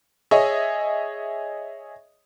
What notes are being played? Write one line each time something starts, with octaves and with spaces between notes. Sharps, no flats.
G#4 C#5 D#5 E5